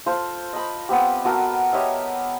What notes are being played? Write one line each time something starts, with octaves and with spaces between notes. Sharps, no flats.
F4 A4 C5
D#5 B5
B3 C4 G4
B3 F#4 A4 A#4
G4 C#5 D#5 E5